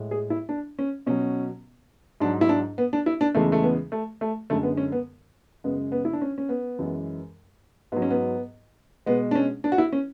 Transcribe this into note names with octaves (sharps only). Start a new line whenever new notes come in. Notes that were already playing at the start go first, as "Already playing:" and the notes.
Already playing: A2 G#3
G#4
E4
D4
C#4
B2 F#3 C#4
G#2 F#3 D4
E4
D4
B3
D4
E4
D4
E2 C#3 E3 G#3 A3
A3
B3
A3
A3
F#2 D3 G#3 A3
B3
C#4
B3
F#2 C#3 G#3 B3
B3
E4
D4
C#4
C#4
B3
F#2 E3 G#3
G#2 F#3 B3
C#4
B3
B2 G#3 B3
D4
C#4
D4
F#4
E4
C#4